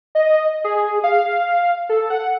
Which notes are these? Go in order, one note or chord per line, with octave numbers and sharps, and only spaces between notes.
D#5
G#4
F5
A4
F#5